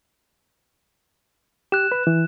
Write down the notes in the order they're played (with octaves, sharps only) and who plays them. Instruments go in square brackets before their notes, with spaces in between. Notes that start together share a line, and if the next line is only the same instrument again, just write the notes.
[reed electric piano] G4 [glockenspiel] F#6 E7
[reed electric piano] B4
E3